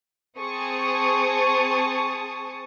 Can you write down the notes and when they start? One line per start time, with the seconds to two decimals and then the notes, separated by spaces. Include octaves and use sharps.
0.39 C4 G#4 A5 C#6 D#6